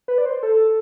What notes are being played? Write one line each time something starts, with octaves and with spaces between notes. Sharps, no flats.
B4
D5
C5
A4